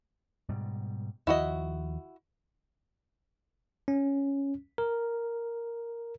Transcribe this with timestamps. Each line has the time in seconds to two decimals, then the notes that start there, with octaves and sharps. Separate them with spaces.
0.49 G#2 B2 G3
1.27 D#2 D#3 F3 E4 F#4 D#5
3.88 C#4
4.78 A#4